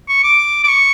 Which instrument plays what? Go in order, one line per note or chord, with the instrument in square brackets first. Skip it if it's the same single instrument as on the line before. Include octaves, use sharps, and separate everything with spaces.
[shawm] C#6
D6
D6
C#6